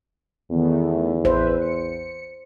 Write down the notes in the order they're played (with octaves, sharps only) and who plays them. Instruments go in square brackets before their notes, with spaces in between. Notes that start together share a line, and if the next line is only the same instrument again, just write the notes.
[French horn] E2 [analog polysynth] D#3 A3 B3
[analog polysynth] A1 B4 E5 [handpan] C5
[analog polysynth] C#7